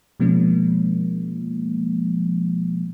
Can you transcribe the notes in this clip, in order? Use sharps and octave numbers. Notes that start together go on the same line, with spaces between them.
B2 F3 G#3 A#3 C#4